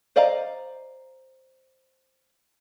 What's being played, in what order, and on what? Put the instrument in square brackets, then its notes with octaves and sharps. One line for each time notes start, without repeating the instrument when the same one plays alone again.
[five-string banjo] C5 D5 D#5 F5 A#5